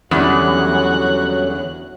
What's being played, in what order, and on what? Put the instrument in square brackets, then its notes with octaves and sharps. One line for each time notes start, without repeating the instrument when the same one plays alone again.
[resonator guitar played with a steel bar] E2 [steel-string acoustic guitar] D3 G3 C#4 [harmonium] F#3 [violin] F#4 F#6